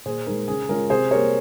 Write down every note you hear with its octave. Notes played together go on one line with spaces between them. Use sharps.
A#2 G#4 C5
G#3 D#4 A#4
C#3 G#4
G#3 C#4 F4 A#4
C3 G#4 C5
G3 A#3 A#4 C#5